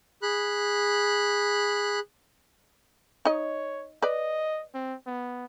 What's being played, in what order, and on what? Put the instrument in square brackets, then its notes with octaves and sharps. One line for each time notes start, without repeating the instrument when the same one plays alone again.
[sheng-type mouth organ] G#4 B5 F#6
[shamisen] D#4 D#5 [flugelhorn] C#5
[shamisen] B4 D5 [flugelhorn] D#5
[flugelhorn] C4
B3